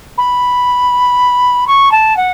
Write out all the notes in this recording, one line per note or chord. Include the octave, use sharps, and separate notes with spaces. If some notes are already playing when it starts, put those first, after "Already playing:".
B5
C#6
A5
F#5